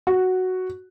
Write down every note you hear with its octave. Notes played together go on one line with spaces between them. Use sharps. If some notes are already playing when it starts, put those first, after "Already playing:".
F#4